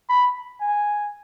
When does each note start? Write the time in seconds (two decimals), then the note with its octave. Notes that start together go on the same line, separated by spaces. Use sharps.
0.09 B5
0.61 G#5